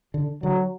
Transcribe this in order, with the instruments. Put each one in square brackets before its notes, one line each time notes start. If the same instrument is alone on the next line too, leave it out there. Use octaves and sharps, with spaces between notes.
[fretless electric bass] D3
[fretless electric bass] D3 [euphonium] F#3